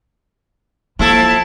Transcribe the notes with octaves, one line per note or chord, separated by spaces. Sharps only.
E3 F3 A#3 E4 A4 A5